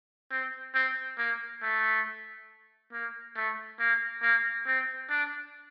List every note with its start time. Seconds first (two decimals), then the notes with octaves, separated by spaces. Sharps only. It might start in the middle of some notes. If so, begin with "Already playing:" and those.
0.31 C4
0.74 C4
1.18 A#3
1.62 A3
2.93 A#3
3.36 A3
3.79 A#3
4.22 A#3
4.66 C4
5.10 D4